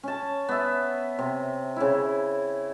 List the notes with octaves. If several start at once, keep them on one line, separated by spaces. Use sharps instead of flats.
C#4 A5
B3 E5
C3
C#3 E4